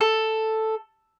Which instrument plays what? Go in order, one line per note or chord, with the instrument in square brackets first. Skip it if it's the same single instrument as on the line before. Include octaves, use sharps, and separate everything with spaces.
[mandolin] A4